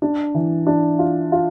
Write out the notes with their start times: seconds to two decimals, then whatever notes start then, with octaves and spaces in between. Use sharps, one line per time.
0.02 D4
0.34 E3
0.67 D4
0.99 F4
1.32 F4